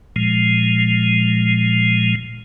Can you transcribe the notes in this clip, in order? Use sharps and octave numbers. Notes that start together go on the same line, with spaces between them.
A#2 F3 G#3